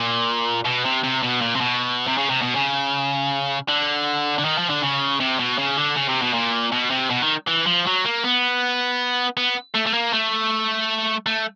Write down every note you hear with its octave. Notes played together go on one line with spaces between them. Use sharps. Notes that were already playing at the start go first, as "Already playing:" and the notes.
Already playing: A#2
B2
C3
C3
B2
A#2
C3
B2
C3
C#3
C3
B2
C#3
D3
D3
D#3
F3
D3
C#3
C3
B2
C#3
D3
C#3
C3
B2
A#2
B2
C3
B2
D#3
E3
F3
F#3
A#3
B3
B3
A3
A3
A#3
A3
A3